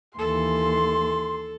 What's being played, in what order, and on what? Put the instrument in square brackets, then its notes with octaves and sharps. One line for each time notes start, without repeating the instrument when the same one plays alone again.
[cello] D#2 E3 [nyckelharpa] A4 [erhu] C6